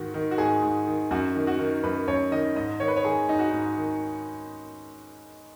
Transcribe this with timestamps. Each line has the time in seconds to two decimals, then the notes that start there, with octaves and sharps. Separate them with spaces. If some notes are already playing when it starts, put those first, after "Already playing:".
Already playing: G#2 D#3 F#4
0.14 D#3
0.31 F#4
0.38 G#2 G#4
0.62 G#2
0.87 D#3
1.11 F#2 F#4
1.35 D#3
1.47 F#4
1.59 D#3
1.83 F#2 B4
2.08 F#2 C#5
2.32 D#3 D#5
2.56 G#2 D#5
2.80 D#3 C#5
2.88 B4
2.96 C#5
3.05 D#3 G#4
3.29 G#2 D#4
3.39 F#4
3.50 G#2 D#4
3.77 D#3